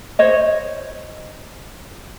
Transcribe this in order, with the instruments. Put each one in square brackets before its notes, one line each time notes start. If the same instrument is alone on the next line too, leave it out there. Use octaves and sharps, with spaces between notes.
[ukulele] C5 C#5 D#5